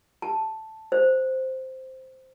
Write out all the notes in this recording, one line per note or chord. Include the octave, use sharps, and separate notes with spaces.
A5
C5